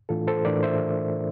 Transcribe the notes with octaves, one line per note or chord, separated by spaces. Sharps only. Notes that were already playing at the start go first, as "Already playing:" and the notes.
A2 E3 A3 D4 F4 A4
A4 C5
A2 E3 A3 D4 A#4 D5
C5 E5